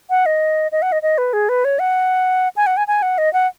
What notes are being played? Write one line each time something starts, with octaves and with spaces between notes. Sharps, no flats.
F#5
D#5
D#5
F#5
D#5
D#5
B4
G#4
B4
C#5
F#5
G#5
F#5
G#5
G#5
F#5
D#5
F#5